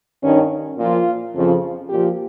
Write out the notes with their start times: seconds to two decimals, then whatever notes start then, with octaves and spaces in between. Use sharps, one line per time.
0.22 G2 D#3 C#4
0.78 A#2 F3 F4
1.34 F2 C#3 F3
1.90 A#2 F3 G4